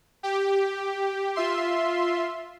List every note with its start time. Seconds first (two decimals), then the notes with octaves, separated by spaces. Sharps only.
0.23 G4
1.36 F4 E5 C6